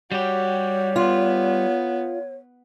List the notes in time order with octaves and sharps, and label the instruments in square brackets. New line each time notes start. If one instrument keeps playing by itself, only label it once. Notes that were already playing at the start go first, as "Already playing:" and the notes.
[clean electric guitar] G3 G4 [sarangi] F#4 [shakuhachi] C#5
[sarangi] B3 [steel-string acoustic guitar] F4